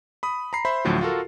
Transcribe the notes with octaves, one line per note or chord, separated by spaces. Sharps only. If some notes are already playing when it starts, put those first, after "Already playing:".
B5 D#6
A#5 B5 C7
C5 E5 B5 C6
D2 A2 D3 F3 F#3
F4 F#4 A4 A#4